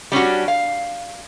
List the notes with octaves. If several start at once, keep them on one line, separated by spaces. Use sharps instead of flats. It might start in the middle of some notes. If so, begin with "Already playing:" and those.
G3 C#4 D4 F#4
F5